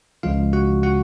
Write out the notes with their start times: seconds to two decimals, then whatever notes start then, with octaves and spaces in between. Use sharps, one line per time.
0.23 C#2 C#3 F3 G#3 F4 F5
0.53 F#4 F#5
0.83 F#4 F#5